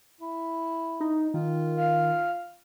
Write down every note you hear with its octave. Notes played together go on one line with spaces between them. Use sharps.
E4
D#4
D#3 F4
F5